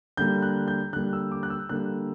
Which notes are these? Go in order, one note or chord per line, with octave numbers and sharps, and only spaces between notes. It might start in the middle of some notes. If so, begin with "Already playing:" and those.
D3 G3 A#3 G6
F#6
G6
D3 G3 A#3 F#6
E6
D6
F#6
E6
D3 G3 A#3 F#6